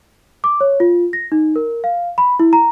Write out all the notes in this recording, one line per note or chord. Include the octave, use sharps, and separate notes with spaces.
D6
C#5
F4
A#6
D#4
A#4
F5
B5
E4
A#5